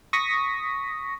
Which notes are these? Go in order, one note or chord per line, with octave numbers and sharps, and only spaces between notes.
C#6 D#6 A#6 B6